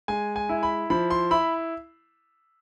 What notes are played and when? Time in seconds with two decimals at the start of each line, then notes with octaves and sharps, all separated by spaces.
0.08 G#3 G#5
0.36 G#5
0.49 E4
0.63 B5
0.90 F3 B5
1.10 C6
1.31 E4 B5